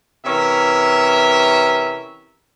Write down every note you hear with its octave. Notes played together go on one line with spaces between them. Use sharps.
C3 E3 C#4 A#4 E5